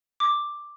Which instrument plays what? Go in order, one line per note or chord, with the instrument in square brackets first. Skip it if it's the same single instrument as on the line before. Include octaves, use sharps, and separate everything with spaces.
[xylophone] D6